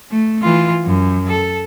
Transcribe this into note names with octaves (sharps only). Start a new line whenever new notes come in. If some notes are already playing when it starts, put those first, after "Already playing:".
A3
E3 F4
F#2
A4